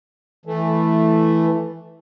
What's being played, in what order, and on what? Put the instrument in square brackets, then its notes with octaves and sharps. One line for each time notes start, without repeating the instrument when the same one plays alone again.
[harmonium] E3 A3